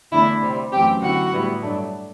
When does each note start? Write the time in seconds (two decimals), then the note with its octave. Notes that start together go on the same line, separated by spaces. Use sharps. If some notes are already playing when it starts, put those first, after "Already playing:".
0.12 E2 D3 A3 D4 E4 E5
0.42 C3 G3 C4
0.72 F#2 E3 A3 C4 G4 G5
1.02 D3 F#3 B3 E4 F#4 F#5
1.33 A2 G3 B3 E4
1.63 G2 F#3 A3 D4